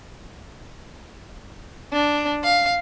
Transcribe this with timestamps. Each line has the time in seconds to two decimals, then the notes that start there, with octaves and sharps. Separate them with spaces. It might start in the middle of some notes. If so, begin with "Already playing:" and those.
1.92 D4
2.44 F5